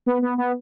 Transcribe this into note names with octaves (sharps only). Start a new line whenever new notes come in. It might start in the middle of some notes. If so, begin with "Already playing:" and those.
B3
B3
B3